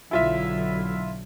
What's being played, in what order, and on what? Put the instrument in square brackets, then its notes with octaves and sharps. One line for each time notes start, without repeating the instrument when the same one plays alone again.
[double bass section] B1 D3 F#3 [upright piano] E4 F4 E5